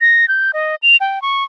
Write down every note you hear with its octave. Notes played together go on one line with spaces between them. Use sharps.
A#6
G6
D#5
F7
G5
C#6